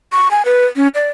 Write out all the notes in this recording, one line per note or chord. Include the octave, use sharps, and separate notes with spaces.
C#6
G#5
B4
C#4
D5